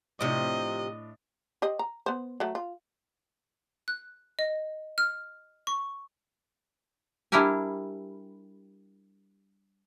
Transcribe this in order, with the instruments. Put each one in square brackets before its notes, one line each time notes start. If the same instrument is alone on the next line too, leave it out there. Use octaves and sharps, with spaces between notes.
[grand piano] A2 D4 [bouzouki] C3 F3 [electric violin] D#5
[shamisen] G4 C5 D#5
A#5
B3 C5
F#3 A3
F4
[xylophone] F#6
D#5
F6
C#6
[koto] G3 D4 E4 G4 A#4 G#5